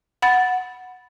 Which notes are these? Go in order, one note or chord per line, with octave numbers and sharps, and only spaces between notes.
F#5 B5 A6